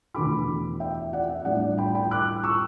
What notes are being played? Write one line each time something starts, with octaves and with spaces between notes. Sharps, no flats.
E2 B2 A3 D4 B5 D6
E5 G5
D5 F#5
E5
A2 G3 D4 D5 F#5
D5
G5 B5
G5 B5
D6 F#6
C#6 E6